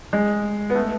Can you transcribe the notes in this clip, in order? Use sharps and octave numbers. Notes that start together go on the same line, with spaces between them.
G#3
B3
A3